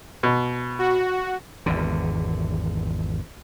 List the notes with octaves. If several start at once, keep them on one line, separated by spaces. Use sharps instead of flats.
B2
F#4
G#1 E2 D3